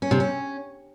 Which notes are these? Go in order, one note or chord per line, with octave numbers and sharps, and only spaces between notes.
C#4
C3
C#4